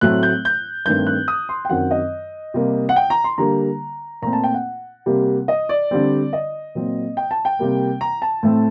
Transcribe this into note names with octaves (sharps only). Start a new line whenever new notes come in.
A2 F#3 A3 C4 F#6
G6
G6
G2 D#3 A3 C4 G6
F#6
D#6
C6
G5
F#2 D#3 F#3 C4 F#5
D#5
C3 G3 A#3
F#5
G5
A#5
C6
D3 G3 A#3 A#5
A#2 A3 C4 A#5
A5
G5
F#5
C3 G3 A#3
D#5
D5
D3 G3 C4
D#5
A#2 F#3 C4
G5
A5
G5
C3 G3 A#3
A#5
A5
A2 A3 C4